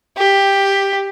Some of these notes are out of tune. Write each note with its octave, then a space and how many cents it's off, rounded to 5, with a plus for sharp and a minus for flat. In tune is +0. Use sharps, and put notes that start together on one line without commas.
G4 +10